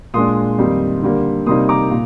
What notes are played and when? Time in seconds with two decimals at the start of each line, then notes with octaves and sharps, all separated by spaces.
0.14 A#2 G#3 D4 C6 D#6
0.58 F2 D#3 G3 A#3 D#4
1.03 D3 G3 A#3
1.46 C3 G3 A#3 D#4 C6 D#6
1.69 A#5 D6
1.91 A#2